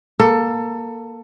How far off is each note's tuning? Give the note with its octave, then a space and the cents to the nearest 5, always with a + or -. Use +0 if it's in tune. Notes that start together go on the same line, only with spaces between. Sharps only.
A#3 +10 A4 +20